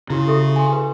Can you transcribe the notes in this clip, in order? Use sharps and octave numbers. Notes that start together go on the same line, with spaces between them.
C#3 E4 F#4
G4 A4 E5
G#5 C6
B4